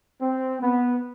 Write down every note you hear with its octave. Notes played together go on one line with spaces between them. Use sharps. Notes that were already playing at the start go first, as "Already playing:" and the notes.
C4
B3